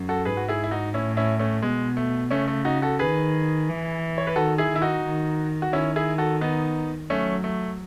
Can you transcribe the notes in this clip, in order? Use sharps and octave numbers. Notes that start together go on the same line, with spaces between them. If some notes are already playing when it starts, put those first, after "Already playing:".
Already playing: F#2
F#4 A4
G#2 G#4 B4
F#4
E4 G#4
E4
D#4 F#4
A2 C#4 E4
C#4 E4
A3 C#4
B2 G#3
A3
C#3 A3 C#4
A3
D#4 F#4
F#4 A4
D#3 G#4 B4
E3
C#5
B4
D#3 F#4 A4
E4 G#4
D#3
E4
D#4 F#4
D#3
F#4
D#3 C#4 E4
E4 G#4
F#4 A4
B3 D#4
F#3 A3 C#4
A3